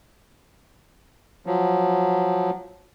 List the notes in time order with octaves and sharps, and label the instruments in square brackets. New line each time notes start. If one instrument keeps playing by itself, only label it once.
[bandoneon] F3 F#3